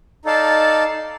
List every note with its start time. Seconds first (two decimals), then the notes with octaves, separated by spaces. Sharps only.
0.25 D#4 A4 D5 F5 A5